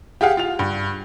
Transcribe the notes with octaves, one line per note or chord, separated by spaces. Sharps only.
G4 G#4 F5 F#5
F4 F7
G2